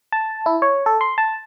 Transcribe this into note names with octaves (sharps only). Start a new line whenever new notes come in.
A5
E4
C#5
A4
C6
A5